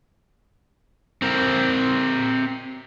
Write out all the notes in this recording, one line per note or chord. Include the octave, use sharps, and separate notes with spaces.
C4 A#4